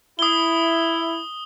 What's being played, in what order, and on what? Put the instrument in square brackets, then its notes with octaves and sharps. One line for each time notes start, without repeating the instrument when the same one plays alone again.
[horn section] E4 [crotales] D#6 G7